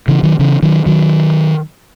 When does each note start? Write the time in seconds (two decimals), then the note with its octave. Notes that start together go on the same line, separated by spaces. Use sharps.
0.08 C#3 E3
0.23 D#3 F#3
0.39 C#3 E3
0.63 D#3 F#3
0.86 D#3 F#3